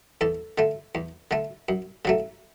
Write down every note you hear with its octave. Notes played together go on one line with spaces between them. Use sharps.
E2 A4
D3 A3
E2
D3 A3
F#2
C#3 F#3 A3